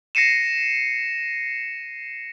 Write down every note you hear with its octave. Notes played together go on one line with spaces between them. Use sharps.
A#6 C7 C#7 D#7 E7